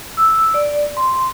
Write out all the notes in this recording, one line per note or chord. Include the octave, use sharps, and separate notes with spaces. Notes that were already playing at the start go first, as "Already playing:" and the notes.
E6
D5
C6